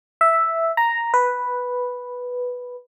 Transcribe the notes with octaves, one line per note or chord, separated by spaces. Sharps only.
E5
A#5
B4